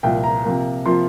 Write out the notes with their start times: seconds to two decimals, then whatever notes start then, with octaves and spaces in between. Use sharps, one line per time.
0.03 C2 A#2 F3 G5
0.24 A#5
0.45 C3 F3 A#3
0.86 C3 F3 A#3 F4 C6